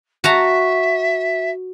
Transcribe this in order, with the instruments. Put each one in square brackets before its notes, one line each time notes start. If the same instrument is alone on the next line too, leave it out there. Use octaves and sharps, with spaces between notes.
[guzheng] F#4 A5 A#5 [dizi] E5